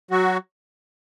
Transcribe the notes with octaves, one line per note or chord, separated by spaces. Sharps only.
F#3 F#4